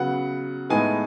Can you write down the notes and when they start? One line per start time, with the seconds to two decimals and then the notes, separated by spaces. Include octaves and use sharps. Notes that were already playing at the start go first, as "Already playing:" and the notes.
Already playing: C#3 F#3 B3 F#5
0.70 A2 G#3 B3 D#4 G#5